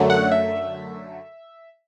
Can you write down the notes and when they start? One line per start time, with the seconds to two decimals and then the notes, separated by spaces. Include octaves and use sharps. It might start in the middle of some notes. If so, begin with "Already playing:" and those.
Already playing: F#2 D3 F#3 A3
0.10 F#5
0.32 E5